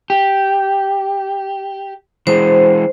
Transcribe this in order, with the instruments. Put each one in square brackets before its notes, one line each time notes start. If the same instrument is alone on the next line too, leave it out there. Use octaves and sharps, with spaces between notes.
[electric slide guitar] G4
[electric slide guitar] E3 G#3 [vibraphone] C5